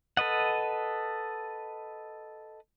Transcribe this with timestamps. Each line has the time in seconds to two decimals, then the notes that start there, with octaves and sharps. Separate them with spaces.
0.17 A4 B4 D#5 F#5